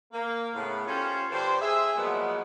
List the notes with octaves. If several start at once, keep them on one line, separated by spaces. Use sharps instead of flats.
A#3
A2 C#3 B3
C#4 F4 G4 A4 C5 C#5
G2 D3 G4 C5
G#4 E5
A#2 F3 F#3 G#3 B3